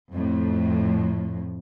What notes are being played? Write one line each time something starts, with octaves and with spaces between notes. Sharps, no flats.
F2 A2